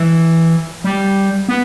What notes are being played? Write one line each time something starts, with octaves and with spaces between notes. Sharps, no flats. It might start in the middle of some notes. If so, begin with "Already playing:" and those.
Already playing: E3
G3
B3